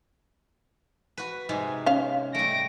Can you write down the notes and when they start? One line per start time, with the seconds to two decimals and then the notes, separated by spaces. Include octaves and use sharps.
1.18 F#4 B4
1.49 G#2 C3 G#3
1.86 C#4 F5
2.35 G3 A3 A#6 D7